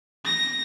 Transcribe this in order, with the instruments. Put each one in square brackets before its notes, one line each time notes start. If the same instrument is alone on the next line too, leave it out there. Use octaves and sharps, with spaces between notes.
[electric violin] A#6